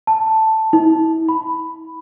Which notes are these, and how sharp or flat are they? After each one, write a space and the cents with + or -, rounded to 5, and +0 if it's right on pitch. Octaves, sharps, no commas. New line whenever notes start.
A5 +5
E4 -35
B5 +5